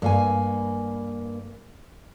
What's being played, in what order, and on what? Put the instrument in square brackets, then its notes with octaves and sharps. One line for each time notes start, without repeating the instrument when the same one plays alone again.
[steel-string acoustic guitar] G2 A#3 G#5